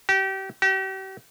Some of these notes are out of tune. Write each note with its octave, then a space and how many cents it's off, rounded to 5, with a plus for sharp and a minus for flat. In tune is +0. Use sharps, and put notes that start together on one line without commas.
G4 -30
G4 -40